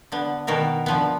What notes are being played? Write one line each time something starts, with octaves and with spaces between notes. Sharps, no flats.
D3 B3
B2 D#3 B3 A#4
D3 F3 B3